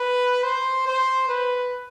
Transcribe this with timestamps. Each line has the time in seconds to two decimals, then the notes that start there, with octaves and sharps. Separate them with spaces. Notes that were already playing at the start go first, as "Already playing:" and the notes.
Already playing: B4
0.43 C5
0.87 C5
1.28 B4